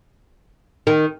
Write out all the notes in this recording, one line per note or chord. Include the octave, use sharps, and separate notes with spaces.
D#3